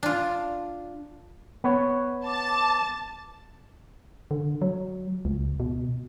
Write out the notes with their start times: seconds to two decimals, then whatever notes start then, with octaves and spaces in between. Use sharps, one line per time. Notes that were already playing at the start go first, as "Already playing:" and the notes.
0.03 D4 F4
1.64 B3 B4 C#5
2.27 A5 D6
4.31 D3
4.62 F#3
5.25 C#2
5.60 B2